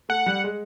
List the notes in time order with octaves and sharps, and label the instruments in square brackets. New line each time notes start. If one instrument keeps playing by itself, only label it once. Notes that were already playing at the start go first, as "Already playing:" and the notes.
[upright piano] A3 [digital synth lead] F#5
[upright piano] G3
G#3